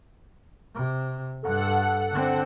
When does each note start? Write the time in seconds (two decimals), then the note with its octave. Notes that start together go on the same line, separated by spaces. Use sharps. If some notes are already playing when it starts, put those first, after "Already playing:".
0.75 C3
1.43 G2 A4 F#5
2.11 D3 C4